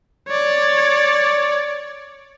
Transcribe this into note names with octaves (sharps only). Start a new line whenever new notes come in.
C#5 D5